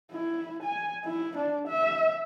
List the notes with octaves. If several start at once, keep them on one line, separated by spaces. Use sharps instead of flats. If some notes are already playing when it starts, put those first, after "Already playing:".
E4
G#5
E4
D4
E5